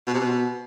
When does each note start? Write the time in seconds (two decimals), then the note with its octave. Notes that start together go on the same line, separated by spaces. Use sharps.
0.07 B2
0.14 C3
0.20 B2